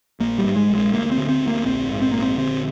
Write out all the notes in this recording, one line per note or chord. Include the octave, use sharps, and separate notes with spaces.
A#1 A#3
G3
G#2
G#3
A#1
G#3
D2 A#3
C4
D3
C4
D2
A#3
A#1 C4
G#2
C4
A#1 A#3
C4
D3 C4